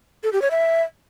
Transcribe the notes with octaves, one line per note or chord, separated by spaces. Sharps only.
A4
G4
C#5
E5